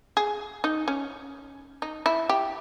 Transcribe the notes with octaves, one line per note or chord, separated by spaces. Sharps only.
G#4
D#4
C#4
D#4
E4
G4